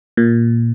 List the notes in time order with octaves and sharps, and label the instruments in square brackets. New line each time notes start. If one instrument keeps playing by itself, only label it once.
[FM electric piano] A#2